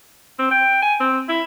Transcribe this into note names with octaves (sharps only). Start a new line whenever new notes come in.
C4
G5
G#5
C4
E4